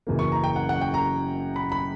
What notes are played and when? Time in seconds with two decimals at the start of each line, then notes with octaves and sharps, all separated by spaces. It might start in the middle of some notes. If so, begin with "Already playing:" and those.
0.07 F#1 F#2 C#3 E3 A#3
0.19 C#6
0.32 A#5
0.44 G5
0.56 F#5
0.69 F#5
0.81 G5
0.94 A#5
1.56 B5
1.72 B5